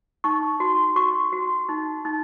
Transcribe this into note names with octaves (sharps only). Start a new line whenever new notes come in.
D#4 C#6
F#4
F#4 C#6
F#4
D#4
D#4